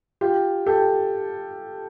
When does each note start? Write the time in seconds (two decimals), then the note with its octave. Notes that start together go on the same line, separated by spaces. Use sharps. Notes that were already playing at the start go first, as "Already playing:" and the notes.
0.21 F4 G4
0.66 G4 A4